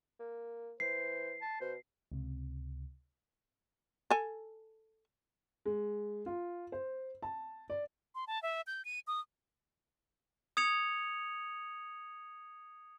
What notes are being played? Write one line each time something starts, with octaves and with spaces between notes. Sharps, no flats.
A#3
E3 C5 C7
A5
B2 C5
C#2 C3
A4 G#5
G#3
F4
C5
A5
D5
C6
A5
E5
G6
D#7
D#6
D#6 G#6 C#7 F7